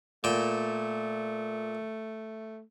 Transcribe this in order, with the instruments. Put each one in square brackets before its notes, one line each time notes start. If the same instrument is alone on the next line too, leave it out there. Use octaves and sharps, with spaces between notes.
[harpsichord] A#2 G5 [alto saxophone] A3